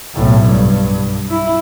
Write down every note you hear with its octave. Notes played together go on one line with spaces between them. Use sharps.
B1 A2
G2
E4